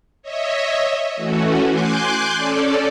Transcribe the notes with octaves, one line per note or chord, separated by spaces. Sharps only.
C#5 D#5 E5
E3 A3 C#4 F#4
G#5 C6 D6 F#6 G6
C#4 A4 D5